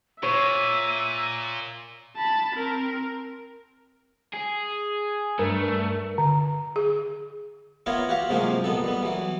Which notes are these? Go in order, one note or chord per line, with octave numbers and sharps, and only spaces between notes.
A#2 C#5 E5 D#7
A5 B5
C4 A#4
G#4
G2 A3 A#4
D3
G#4
B3 E4 F4 A#4 C#5
F#4 G4 F5
G#2 C3 F3 F#3 A#3 C#4
A#1 D#3 B3 A4
G3 B3
E3 F#3